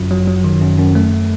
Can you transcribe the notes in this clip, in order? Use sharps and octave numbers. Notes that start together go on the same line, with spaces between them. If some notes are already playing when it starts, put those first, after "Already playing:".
Already playing: G1 F#2 F#3
F#3
F#3
D#3
F#2
F#2
A3